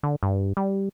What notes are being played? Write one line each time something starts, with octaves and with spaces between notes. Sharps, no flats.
D3
G2
G3